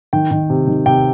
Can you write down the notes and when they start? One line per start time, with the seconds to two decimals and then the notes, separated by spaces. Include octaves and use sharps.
0.13 D#3 G5
0.31 D#3
0.50 C3
0.67 D#3
0.86 C3 G5